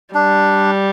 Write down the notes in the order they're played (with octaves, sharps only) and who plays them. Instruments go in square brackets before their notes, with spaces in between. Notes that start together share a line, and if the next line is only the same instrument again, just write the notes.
[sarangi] G3 [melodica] D4